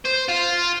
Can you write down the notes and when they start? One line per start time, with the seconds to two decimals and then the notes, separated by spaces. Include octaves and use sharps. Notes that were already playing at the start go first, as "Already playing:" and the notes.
0.05 C5
0.28 F4